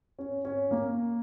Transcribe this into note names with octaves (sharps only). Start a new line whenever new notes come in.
C#4
C#4
A#3